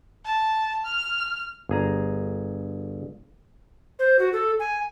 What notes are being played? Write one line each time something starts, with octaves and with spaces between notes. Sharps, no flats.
A5
F6
G1 G#4 A#5
C5
F#4
A4
G#5